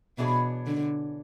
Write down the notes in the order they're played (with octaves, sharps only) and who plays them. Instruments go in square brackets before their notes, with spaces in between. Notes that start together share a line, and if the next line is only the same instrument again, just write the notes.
[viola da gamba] B2 [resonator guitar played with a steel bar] E3 B3 D4 G#4 C#5
[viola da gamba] D3